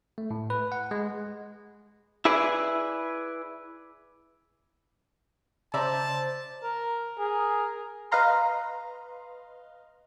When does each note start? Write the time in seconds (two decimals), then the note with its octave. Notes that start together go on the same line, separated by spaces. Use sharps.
0.18 A3
0.31 A2
0.50 B4
0.72 F#5
0.91 G#3
2.25 E4 G#4 B4 D5
5.74 C#3 C5 D5 E5 A5 A#5
6.63 A#4
7.19 G#4 A#4
8.12 B4 D#5 F5 A#5 C6